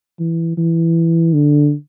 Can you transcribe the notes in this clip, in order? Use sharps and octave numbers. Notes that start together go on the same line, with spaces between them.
E3
E3
D3